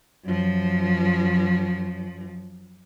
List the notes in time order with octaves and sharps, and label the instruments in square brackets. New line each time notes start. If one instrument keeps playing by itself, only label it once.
[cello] F#2 F3